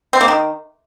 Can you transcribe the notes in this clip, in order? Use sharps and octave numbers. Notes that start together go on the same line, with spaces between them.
C4
A#3
D#3